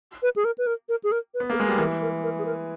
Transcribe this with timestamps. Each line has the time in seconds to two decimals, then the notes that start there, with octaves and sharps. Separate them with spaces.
0.22 B4
0.36 G#4
0.44 A#4
0.58 B4
0.67 A#4
0.89 A#4
1.04 G#4
1.12 A#4
1.34 B4
1.40 B3
1.50 A#3 G#4
1.56 A#4
1.60 G#3
1.68 G3
1.78 E3 A#4
2.02 A#4
2.23 A#4
2.38 G#4
2.45 A#4